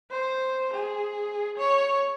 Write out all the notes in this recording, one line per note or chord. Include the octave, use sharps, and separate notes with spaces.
C5
G#4
C#5